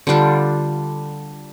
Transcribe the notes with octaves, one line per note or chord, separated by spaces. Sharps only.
D3 G3 D4 F4